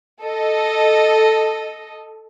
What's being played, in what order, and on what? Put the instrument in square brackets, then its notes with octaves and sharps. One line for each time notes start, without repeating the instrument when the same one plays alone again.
[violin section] A4 D#5